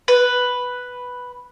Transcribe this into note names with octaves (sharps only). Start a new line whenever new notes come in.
B4